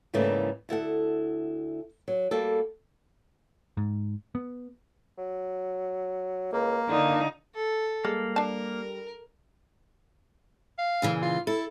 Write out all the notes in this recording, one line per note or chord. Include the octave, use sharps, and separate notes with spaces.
G#2 C#3 E3 G3 A3 A#3
D2 E4 A4 F#5
F#3
G3 A#3 F#4 A4
G#2
B3
F#3
C#2 A#3
D3 D#4 F4
A4
G3 G#3 A#3
D4 A#4 A5
F5
A#2 C#3 E3
F4
E4 A4